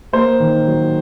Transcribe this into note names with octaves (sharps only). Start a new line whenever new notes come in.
A#3 C5
D#3
F#3